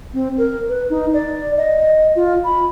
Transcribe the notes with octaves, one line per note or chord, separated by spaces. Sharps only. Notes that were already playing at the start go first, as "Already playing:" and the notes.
C4
A#4
B4
D#4
D5
D#5
F4
B5